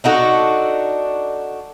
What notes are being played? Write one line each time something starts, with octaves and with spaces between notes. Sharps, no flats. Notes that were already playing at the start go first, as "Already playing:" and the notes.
D4 D#4 F#4 A4